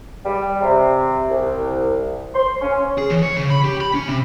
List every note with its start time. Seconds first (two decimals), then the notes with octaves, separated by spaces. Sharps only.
0.26 G3
0.61 C3
1.29 C2
2.35 C6
2.61 C#4
2.98 G#4
3.10 E3
3.23 C#5
3.36 C#3
3.50 B5
3.64 G4
3.81 B5
3.95 C#4
4.08 C3